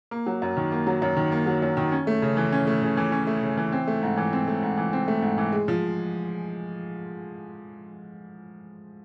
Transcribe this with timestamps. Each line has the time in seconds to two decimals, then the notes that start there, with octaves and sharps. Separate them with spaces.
0.11 A#3
0.27 F#3
0.42 F#2
0.57 D#3
0.72 A#3
0.87 F#3
1.02 F#2
1.17 D#3
1.32 A#3
1.46 F#3
1.62 F#2
1.77 D#3
1.92 C#4
2.07 A3
2.22 C#3
2.37 E3
2.52 C#4
2.67 A3
2.82 C#3
2.97 E3
3.12 C#4
3.27 A3
3.43 C#3
3.58 E3
3.72 C4
3.88 A3
4.03 G#2
4.17 E3
4.33 C4
4.48 A3
4.62 G#2
4.78 E3
4.93 C4
5.08 A3
5.22 G#2
5.38 E3
5.52 G#3
5.68 F3